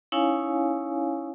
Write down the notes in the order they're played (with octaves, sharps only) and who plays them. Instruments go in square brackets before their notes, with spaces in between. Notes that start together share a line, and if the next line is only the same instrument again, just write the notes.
[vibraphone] C#4 D#4 E4 C#5 F5 G#5